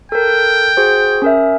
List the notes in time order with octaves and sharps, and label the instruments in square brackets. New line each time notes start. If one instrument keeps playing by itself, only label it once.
[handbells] A4 A#4 [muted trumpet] G5
[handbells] F#4 G#4 C5
C#4 A#4 E5